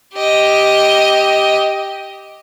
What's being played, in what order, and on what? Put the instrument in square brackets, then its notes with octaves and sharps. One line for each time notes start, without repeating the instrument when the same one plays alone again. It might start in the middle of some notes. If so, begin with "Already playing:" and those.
[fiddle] G4 D#5